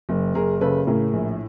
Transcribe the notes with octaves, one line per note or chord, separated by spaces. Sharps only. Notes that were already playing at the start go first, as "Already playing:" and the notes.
F#1
F#1 G#4 A#4
C#3 A4 B4
A2 G#4 A#4
A#1